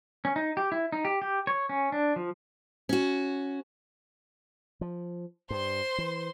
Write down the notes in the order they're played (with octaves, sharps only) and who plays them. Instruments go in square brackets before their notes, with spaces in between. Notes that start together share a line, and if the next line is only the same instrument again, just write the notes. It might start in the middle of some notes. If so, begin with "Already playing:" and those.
[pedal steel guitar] C#4
D#4
G4
E4
D#4
G4
G4
C#5
C#4
D4
F3
[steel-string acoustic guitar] C#4 F#4
[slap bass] F3
[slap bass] G2 [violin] C5 C6
[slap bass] E3